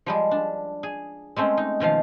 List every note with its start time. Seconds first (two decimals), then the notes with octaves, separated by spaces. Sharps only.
0.06 F3 G3 G#3
0.31 D4
0.83 G#4
1.36 G#3 A3 C4 C#4
1.57 D#4
1.80 B2 D#3 F3 F5